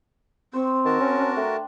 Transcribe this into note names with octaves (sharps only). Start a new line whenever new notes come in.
C4 C5 C#6
D#3 F#4 A#4 A5
C#4
D4 A#5
A3 G5